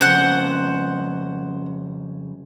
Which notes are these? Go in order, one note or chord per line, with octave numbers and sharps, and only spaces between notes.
F2 C#3 C5 F#5